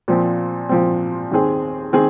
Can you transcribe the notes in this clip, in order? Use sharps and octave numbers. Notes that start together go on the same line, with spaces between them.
A#2 F3 C4
A#2 F3 C4
D#2 D#3 C4 G#4
D#3 C4 G#4